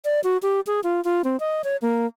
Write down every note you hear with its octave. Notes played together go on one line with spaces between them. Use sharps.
D5
F#4
G4
G#4
F4
F4
C4
D#5
C#5
A#3